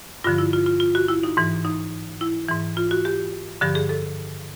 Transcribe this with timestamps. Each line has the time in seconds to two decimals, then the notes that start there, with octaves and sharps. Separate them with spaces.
0.24 G2 D3 F3 F4
0.38 E4
0.53 F4
0.66 F4
0.80 F4
0.95 F#4
1.08 E4
1.23 D#4
1.37 G#2 E3
1.65 D#4
2.21 E4
2.49 G#2 E3
2.77 F4
2.91 F#4
3.05 G4
3.61 G2 D3 F3 G4
3.75 G#4
3.89 A4